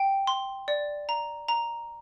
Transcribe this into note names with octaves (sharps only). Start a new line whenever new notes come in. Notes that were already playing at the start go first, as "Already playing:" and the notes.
Already playing: G5
C6
D5
A#5
A#5